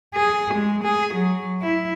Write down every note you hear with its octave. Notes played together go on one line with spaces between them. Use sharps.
G#4
G#3
G#4
F#3
E4